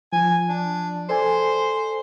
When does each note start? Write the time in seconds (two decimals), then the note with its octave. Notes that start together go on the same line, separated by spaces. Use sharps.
0.13 F3 G#5
0.49 D4
1.09 A4 C5 D5 G#5